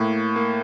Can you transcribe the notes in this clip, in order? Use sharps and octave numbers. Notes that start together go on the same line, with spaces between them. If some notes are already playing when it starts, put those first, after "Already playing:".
Already playing: A2 A#3
A#3